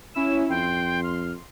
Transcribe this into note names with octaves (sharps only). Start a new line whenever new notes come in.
C#4 E4 E6 E7
F2 G5 C6
F6